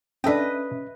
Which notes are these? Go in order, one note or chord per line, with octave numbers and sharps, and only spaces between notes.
C#4 D4 A4 B4 D#5 E5 G5